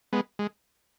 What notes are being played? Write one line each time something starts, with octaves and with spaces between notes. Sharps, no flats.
G#3 B3
G#3